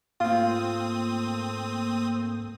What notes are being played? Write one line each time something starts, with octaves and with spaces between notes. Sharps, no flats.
G#2 A3 A#3 C4 F4 D#6